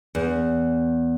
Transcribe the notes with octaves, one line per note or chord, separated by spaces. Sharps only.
E2